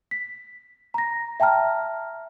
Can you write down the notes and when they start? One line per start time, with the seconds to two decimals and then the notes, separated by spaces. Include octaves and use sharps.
0.11 B6
0.94 A#5 A#6
1.40 E5 G5 A5 A#5 F6